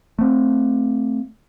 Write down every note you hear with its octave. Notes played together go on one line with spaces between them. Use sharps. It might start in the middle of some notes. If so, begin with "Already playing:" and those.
A3 C4